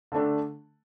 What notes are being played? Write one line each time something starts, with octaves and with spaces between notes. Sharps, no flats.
D3 A3 D4